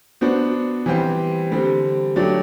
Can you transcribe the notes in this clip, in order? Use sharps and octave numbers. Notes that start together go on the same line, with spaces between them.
B3 D4 F#4 C5
E3 G3 C4 G4 C5
D3 G3 C4
F#3 A3 D4 G4 D5